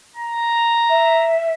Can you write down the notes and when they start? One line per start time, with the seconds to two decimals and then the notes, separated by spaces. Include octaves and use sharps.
0.16 A#5
0.89 E5